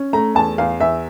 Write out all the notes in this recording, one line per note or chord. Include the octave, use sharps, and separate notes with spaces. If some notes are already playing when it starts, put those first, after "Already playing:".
Already playing: C#4
A3 A#5
E2 A5
E2 F5
E2 E5